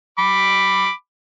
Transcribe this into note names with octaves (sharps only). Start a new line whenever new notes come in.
B5 D6